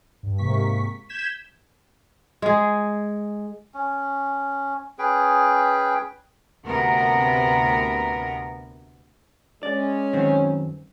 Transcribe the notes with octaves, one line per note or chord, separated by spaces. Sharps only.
G2
G#2 C3 A#3 C#6 B6
G6 G#6 B6 E7
G#3 G#4
C#4
C#4 G#4 B4 G5
D2 C3 B3 A#4
G#3 C#4 D5
F#2 D#3 C4